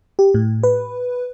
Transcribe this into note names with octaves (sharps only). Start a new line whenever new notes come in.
G4
A2
B4